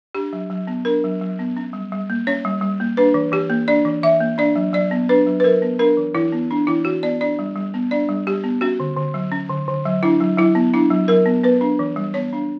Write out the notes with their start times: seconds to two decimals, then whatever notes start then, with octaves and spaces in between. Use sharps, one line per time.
0.15 D4 G4
0.33 F#3
0.50 F#3
0.67 B3
0.85 D4 A#4
1.04 F#3
1.21 F#3
1.39 B3
1.57 C#4
1.73 G3
1.92 G3
2.10 A#3
2.27 C#4 C#5
2.45 G3
2.61 G3
2.80 A#3
2.97 D4 B4
3.14 E3
3.32 E3 G4
3.50 A#3
3.68 D4 D5
3.85 E3
4.03 E3 E5
4.20 A#3
4.38 D4 D5
4.56 F#3
4.73 F#3 D5
4.91 B3
5.09 D4 B4
5.27 F#3
5.40 B4
5.44 F#3 A#4
5.62 B3
5.79 D4 A#4
5.97 E3
6.15 E3 E4
6.32 B3
6.51 D4
6.67 E3 E4
6.85 E3 F#4
7.03 B3 D5
7.21 D4 D5
7.39 G3
7.56 G3
7.74 B3
7.91 D4 D5
8.09 G3
8.27 G3 G4
8.44 B3
8.61 C#4 F#4
8.80 D3
8.96 D3
9.14 F#3
9.32 C#4
9.49 D3
9.68 D3
9.85 F#3
10.03 D4 E4
10.20 F#3
10.38 F#3 E4
10.55 B3
10.74 D4 E4
10.90 F#3
11.08 F#3 A#4
11.26 B3
11.43 B3 B4
11.61 D4
11.79 E3
11.96 G3
12.14 B3 C#5
12.33 D4